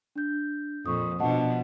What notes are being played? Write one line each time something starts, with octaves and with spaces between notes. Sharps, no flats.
D4 G6
F2 A#2 C#6 D#6
B2 F3 D4 D#5 F#5 A5